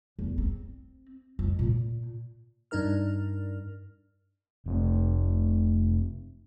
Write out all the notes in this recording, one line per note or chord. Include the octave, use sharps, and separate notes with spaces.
E2
C4
F2
A#2
G2 D4 D#4 A#4 F6
F1 B2 C4